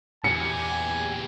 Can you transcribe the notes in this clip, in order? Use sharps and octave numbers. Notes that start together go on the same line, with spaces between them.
E2 A#2 E3 G4 G#5 C#7